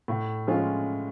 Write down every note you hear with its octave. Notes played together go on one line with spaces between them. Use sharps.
A2
F3 G#3 C#4 F4